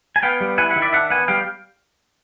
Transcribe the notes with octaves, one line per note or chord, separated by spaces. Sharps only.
G#5
B3 F5 G5
G3
E4 F#5 G#5
E5 F#5
D#3
D5 E5
D4 E5 F#5
B3 F#5 G#5
G3 F5 G5